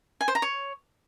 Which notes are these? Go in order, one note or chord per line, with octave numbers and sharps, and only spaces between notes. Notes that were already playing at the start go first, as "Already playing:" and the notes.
G#5
C5
A#5
C#5